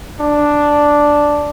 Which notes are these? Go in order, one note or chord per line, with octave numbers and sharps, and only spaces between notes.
D4